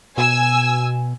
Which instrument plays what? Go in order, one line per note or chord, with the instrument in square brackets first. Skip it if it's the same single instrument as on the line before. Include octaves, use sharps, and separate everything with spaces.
[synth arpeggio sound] B2 [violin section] G#5 E6